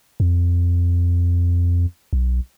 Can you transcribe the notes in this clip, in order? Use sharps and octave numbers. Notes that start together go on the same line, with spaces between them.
F2
B1